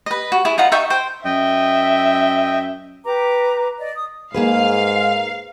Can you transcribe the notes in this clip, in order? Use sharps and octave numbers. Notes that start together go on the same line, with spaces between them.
B4 D#5
F#4
E4 G#4
D#4 F4 F#5 A#5
D#4 E5 G5 C#6
C5 G5
F#2 D#5 E5 G5
G4 B4 A#5 D6
D5 D#5
D#6
G#2 A#3 G#4 B4 F5